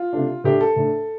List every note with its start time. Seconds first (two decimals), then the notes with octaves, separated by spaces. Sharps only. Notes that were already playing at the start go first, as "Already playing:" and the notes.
Already playing: F4
0.13 C3 A3 D4
0.44 A2 A3 D4 G4
0.61 A4
0.76 A2 A3 D4